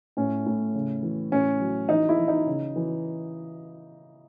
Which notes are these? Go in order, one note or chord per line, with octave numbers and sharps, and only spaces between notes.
A2 C#4
A2
C#3
E3
A2 C#4
F#3
E3 D#4
E4
E3
D#4
C#3
E3